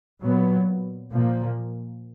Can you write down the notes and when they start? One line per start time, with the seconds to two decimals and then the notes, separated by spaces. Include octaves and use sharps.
0.21 A#2 F#3 B3
1.12 A#2 F3 A#3